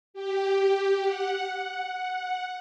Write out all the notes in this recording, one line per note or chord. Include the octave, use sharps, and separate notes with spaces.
G4
F#5